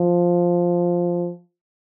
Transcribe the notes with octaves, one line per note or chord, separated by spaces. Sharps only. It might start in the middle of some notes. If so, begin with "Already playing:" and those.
Already playing: F3